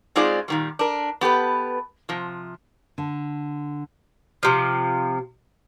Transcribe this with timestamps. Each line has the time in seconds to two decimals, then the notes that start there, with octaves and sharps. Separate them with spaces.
0.16 G#3 C4 D#4 F4 G#4 D5
0.48 A#2 D#3 G3
0.79 D4 A#4
1.21 B3 G4 A4 B4
2.09 C3 F3
2.98 D3
4.43 C3 F3